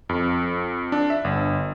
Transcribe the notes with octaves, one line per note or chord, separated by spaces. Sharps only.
F2
D4
E5
G1